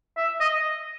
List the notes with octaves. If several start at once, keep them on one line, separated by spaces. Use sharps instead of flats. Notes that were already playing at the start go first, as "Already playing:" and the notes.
E5
D#5